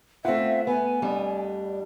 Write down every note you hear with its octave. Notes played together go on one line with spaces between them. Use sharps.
A3 C4 F4 E5 F#5
B3 G#5
F2 G3 D4